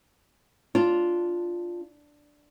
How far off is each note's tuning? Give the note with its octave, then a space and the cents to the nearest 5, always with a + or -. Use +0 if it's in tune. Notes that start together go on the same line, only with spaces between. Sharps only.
D4 +0 F4 +0